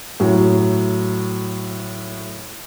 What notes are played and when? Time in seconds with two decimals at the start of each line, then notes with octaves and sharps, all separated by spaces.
0.20 A2 F#3